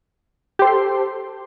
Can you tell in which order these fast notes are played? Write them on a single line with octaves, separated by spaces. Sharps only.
G4 C5 A4 C6